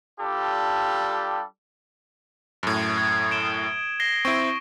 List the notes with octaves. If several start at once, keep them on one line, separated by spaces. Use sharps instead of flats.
G3 D4 F4 G4 A4
F#2 A2
D#6 G#6
D7 E7 G7
A#6 C7 G7
C4 E4 C#6 A#6 D7